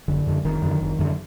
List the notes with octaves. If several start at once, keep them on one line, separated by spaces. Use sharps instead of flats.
F#1 D3
F#2 D3
F#1 D#3
F#2 D3
F#1
F#2 D3